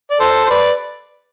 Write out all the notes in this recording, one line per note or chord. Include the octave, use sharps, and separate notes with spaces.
D5
A4 C5
C5
B4 D5